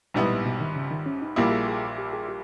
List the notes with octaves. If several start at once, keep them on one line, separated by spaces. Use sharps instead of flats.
A#1 G#2 B2 G3 B3 E4
A#2
B2
D#3
C#3
D#3
C#4
D#4
A#1 A#2 G3 A#3 E4 G4
G#4
G#4
G4
G#4
G4